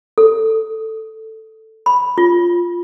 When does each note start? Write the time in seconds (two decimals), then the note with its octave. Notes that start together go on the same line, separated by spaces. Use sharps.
0.18 A4
1.86 B5
2.18 F4